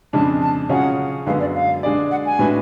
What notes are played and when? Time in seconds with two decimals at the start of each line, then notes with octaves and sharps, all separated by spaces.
0.13 F2 C#3 G#3 D4 A5
0.42 A5
0.69 C#3 F#3 C#4 F4 G#4 F#5
1.26 F#2 D3 G#3 B3 F5
1.40 D5
1.55 F5
1.83 G#3 D4 G#4 D5
2.11 F#5
2.26 G#5
2.39 A2 G#3 D4 F#4 B4